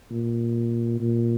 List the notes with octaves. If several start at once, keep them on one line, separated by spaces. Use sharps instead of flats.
A#2
A#2